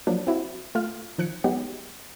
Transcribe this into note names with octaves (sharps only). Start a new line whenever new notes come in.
F3 F#3 A#3 D4
C4 E4 F#4
A3 F4 F6
D#3 F3 F#6 G#6 C#7
F#3 G#3 B3 D#4 F#4 G4